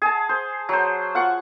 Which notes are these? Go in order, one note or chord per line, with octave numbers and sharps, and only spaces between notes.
G#4 A5
C5
F#3 C5
F4 F#5 C#6